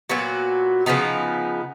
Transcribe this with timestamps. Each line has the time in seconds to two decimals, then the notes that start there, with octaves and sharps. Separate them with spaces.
0.09 A#2 F#3 B3 F#4
0.86 C#3 F3 B3 D#4